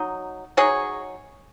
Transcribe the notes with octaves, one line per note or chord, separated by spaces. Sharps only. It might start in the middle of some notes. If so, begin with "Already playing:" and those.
Already playing: F#3 D#4
F#3 D#4 G#4 C#5